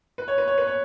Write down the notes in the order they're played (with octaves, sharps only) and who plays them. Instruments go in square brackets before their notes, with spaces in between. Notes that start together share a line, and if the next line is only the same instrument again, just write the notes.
[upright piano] B4
C#5
B4
C#5
B4
C#5